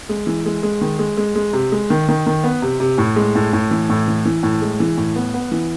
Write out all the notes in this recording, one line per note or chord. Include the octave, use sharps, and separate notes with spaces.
G#3
E3
G#3
G#3
D#3
G#3
G#3
G#3
C3
G#3
D#3
D#3
D#3
B3
C3
C3
A2
G#3
A2
A2
E3
A2
E3
E3
A2
G#3
E3
A2
B3
B3
E3